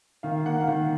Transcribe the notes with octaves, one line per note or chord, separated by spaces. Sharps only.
D#3 F5
A#3 F#5
F5
D#3 F#5